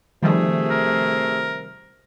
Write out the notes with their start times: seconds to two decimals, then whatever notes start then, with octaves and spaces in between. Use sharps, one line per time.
0.22 C3 D#3 F3 G3 A3 G#4
0.70 A#4